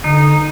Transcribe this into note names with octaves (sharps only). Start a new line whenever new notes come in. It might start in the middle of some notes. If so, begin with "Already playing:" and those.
D3 D#4